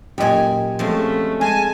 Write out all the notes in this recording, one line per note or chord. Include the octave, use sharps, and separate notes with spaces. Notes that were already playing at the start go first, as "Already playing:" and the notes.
F#2 A#2 G4 D#5 G#5
F3 G#3 A3 C4 C#4
G#3 G#5 A5